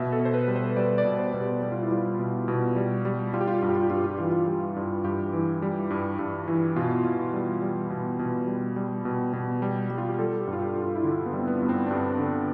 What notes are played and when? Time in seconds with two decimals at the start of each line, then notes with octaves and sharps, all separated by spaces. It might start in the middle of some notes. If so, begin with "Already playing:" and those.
Already playing: B2 E5
0.12 A4
0.20 B2
0.25 C5
0.34 B4
0.48 G3
0.56 C5
0.76 G3 D5
0.98 D5
1.05 B2
1.19 C5
1.34 B2
1.41 G4
1.62 G3 G4
1.72 F4
1.82 E4
1.91 G3 F4
2.19 B2
2.48 B2
2.76 G3
3.05 G3
3.33 G3 F4
3.41 G4
3.47 F4
3.55 G4
3.62 G2 F4
3.69 G4
3.75 F4
3.83 G4
3.90 G2 F4
3.97 G4
4.04 F4
4.11 G4
4.18 E3 F4
4.25 G4
4.32 F4
4.48 G3
4.76 G2
5.04 G2 G4
5.33 E3
5.62 G3
5.90 G2
6.19 G2
6.48 E3
6.76 B2 F4
7.05 B2
7.34 G3
7.62 G3
7.90 B2
8.19 B2
8.47 G3
8.76 G3
9.05 B2
9.33 B2
9.62 G3
9.90 G3
9.98 F4
10.09 G4
10.19 G3 A4
10.40 G4
10.48 G2
10.53 F4
10.62 G4
10.76 G2
10.83 F4
10.96 E4
11.04 D3 D4
11.26 B3
11.33 G3
11.39 C4
11.47 B3
11.62 G2
11.69 C4
11.86 D4
11.90 G2 C4
12.19 D3